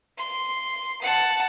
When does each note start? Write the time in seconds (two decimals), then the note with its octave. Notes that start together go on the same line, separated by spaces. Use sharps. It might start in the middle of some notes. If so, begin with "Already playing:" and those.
0.18 C6
1.01 F#5 A5